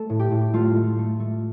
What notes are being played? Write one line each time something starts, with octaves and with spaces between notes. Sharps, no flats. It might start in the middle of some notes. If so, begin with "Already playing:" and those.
Already playing: A3 A4
A2
G4
A2
A3 F4
A3
A3
A3